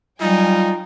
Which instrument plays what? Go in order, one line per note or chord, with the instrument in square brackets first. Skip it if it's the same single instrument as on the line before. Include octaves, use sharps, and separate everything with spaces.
[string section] F#3 G5 G#5 [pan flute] G3 [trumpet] D#4 [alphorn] F4